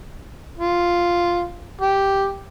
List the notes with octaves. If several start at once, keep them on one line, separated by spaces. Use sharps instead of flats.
F4
G4